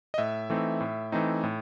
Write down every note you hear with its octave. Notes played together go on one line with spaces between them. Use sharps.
D#5
A2 E5
E3 A3 C4 D#4
A2
E3 A3 C4 D#4
A2